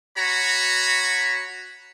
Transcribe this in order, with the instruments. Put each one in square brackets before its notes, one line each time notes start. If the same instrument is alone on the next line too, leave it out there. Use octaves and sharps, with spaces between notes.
[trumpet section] F#4 C#5 A#5 B5